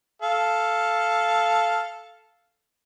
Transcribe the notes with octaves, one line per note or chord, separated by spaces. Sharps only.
A4 F5